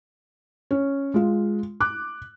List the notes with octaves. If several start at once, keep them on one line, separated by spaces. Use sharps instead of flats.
C#4
G#3 F4
D6 F#6